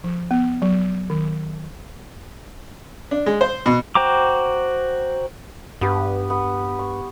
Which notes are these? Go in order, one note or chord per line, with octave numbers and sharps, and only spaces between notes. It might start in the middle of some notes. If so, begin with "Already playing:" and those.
F3
B3
F#3
D#3
D4
G#3
C5
B2
F#4 C5 G5 A#5 D6
G2 B3 G4 B4
B3
C#6